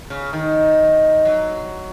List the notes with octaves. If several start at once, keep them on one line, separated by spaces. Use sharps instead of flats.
C#3
D#3
F#3